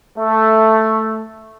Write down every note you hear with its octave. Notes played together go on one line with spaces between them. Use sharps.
A3